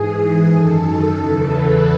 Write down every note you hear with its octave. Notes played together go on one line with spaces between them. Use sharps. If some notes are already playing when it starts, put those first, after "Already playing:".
Already playing: G#2 E3 G#4
F#2 D#3 A4
E2 C#3 E3
B4